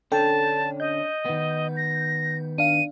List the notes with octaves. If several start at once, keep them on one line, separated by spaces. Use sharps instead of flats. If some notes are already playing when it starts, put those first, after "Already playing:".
D3 C#4 D4 A4 G5 A5
D#5 G6
D#3 B3
A#6
D4 F5 D#7